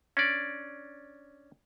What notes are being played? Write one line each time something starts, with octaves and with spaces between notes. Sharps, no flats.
C#4 D4 D5